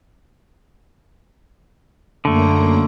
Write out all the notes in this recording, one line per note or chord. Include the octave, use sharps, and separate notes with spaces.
F#2 D3 A3 A#3 A#5